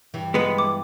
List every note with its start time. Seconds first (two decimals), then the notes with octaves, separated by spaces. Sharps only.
0.14 G2 E3
0.34 G#3 B3 B4
0.58 D6